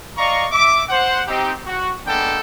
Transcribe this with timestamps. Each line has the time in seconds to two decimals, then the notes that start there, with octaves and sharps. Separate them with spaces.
0.18 D5 D#5 F5 A#5 C#6
0.52 E5 D6
0.89 C5 F#5
1.27 C4 D#4 G4
1.66 F#4
2.06 G#3 A#3 B3 D4 A4 G5